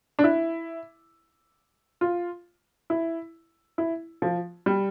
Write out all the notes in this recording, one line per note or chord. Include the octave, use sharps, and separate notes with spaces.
D4
E4
F4
E4
E4
F3
G3